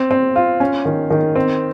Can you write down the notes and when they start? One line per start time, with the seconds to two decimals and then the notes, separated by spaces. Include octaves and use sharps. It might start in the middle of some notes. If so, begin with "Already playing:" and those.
Already playing: C4
0.11 C4
0.36 F4
0.60 C#4
0.85 D#3
1.10 D#3
1.36 C4